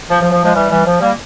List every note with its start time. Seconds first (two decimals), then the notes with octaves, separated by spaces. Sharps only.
0.09 F3
0.20 F3
0.31 F3
0.43 F3 G#3
0.54 E3 G3
0.70 E3 G3
0.85 F3
1.00 G3 A#3